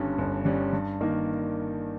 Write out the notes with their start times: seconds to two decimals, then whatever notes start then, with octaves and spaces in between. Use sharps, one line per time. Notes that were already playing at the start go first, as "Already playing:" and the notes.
Already playing: G1 G2 G3 C#4
0.18 G1
0.45 G2 G3 C#4
0.73 G2
1.01 D#3 A#3 D#4 A#4